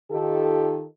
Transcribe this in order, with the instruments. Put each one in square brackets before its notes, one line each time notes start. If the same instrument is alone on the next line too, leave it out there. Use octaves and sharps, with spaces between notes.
[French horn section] D#3 D#4 F4 G4 A4